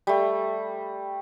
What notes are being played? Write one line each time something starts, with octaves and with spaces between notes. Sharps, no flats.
G3 A3